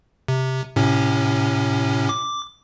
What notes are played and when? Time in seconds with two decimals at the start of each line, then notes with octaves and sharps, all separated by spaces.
0.28 C3
0.77 A2 C3 C#4
2.09 D6